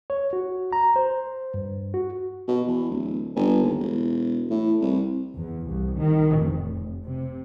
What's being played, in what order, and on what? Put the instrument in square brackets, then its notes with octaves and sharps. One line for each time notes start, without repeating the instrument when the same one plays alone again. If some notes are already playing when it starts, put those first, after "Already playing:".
[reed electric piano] C#5
F#4
A#5
C5
G2
F#4
[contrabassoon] B2
E2
D1
G1
D#2
E1
A2
C2
[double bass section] E2
C2
D#3
F1
C3